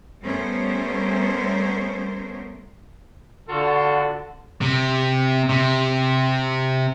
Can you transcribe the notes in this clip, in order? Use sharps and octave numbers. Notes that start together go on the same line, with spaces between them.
G3 A3 B3 C#4 A#4 C5
D3 F4 F#4 A4
C3
C3